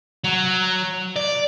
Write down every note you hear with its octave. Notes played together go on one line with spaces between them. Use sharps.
F#3
D5